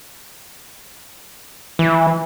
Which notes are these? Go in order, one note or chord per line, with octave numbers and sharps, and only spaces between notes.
E3